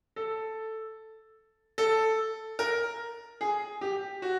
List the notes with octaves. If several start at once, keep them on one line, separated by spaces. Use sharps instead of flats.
A4
A4
A#4
G#4
G4
F#4